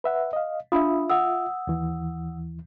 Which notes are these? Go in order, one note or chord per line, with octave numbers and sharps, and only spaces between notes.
B4 E5 F#5
D#5 F5
D4 F4 E5 B5 D#6
F#5 D#6 E6
D#2 E3